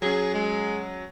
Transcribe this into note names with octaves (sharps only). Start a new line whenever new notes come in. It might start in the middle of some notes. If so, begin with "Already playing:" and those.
F#3 C#4 G#4
G#3